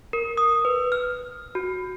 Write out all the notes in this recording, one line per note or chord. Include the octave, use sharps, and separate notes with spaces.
A#4
D#6
B4
F6
F#4